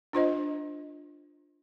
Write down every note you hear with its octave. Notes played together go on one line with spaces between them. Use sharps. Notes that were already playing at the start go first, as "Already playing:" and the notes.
D4 F4 C5 D#5